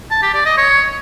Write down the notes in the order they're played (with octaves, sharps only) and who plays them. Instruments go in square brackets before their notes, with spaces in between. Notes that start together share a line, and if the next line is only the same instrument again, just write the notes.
[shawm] A5
G4
D5
D#5
C#5